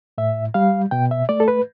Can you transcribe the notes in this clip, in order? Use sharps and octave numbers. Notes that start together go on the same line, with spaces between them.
A2 E5
G3 F5
B2 G5
E5
A3 D5
A4
B4